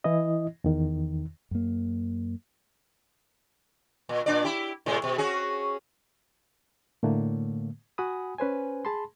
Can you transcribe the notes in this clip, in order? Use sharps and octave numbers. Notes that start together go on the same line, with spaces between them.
E3 E4 D#5
E2 D#3
F#2 A#3
A#2
A#2 D4 D5
E4 G4
A2 C3 G#3
B2
C#4 F#4 G#4
A2 D3 A3 A#3
F#4 F#5 G#5 B5 D#6
C#4 B4 C5 G#5
G#4 A5 B5 C6